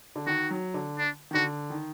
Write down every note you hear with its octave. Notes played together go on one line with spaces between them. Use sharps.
D3
D#3 F#4
F#3
D3
D4
D#3
D3 F#4
D#3